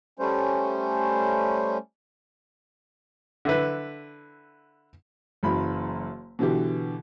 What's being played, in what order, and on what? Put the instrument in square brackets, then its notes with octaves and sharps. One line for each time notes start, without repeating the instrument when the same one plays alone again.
[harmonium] G3 A3 C#4 C5
[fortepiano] D3 E4 B4
[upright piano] F#1 F#2 E3 B5
B2 D3 E3 G4